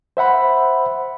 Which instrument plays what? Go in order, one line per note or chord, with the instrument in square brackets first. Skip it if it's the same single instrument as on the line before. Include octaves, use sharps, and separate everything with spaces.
[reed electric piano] C5 E5 F#5 B5